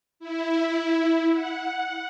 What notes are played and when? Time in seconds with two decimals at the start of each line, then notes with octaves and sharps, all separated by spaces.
0.20 E4
1.33 F#5